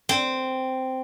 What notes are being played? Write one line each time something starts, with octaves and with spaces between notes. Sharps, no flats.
C4